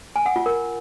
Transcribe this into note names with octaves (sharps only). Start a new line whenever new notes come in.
G#5
F#5
F4
A#4